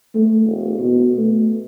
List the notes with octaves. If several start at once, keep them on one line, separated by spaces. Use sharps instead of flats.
A3
E1
B2
A3